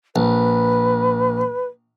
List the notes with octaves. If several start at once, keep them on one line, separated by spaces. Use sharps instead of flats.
A#1 B4